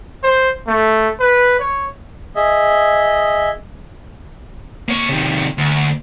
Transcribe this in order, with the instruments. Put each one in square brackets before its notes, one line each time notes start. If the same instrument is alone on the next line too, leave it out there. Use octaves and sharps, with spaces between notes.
[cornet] C5
A3
B4
C#5
[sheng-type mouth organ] G#4 D#5 E5
[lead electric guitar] A#3 C#5
C3 D#3
D2